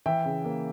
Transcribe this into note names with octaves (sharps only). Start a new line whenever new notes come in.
E3 E5 G5
C#3
A#3